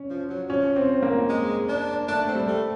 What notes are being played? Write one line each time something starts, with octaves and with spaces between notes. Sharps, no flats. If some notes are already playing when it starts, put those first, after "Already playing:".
Already playing: C#4
F3
F#3
F3 C#4
C4
A#3
G#3
D4
A3 D4
C4
G3
A3